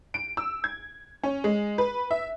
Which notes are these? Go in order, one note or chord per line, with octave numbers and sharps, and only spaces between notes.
D7
E6
G#6
C#4
G#3
B4
E5